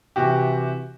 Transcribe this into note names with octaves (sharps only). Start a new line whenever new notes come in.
C3 E3 F#4 G4